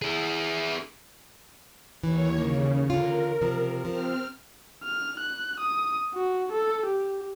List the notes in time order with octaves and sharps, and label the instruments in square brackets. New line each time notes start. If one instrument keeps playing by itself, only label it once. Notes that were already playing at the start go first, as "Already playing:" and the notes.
[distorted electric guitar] E4 G#4
[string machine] D#2 C#5 [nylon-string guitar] E3
[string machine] C#3 [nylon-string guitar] A#3
[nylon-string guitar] D3 F4 [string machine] A#4
[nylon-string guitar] C3 F3
[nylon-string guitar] F3 [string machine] C4 F6
[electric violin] F6
F#6
D#6
F#4
A4
G4